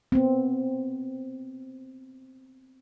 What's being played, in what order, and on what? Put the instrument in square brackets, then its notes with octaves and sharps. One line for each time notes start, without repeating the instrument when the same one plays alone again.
[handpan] B3 C4